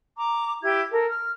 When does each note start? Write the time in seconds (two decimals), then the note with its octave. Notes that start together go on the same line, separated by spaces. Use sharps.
0.17 A#5 D6
0.62 E4 G4 G#6
0.91 A4 A#4
1.08 F6